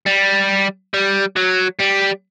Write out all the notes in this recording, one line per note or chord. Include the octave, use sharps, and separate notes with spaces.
G3
G3
F#3
G3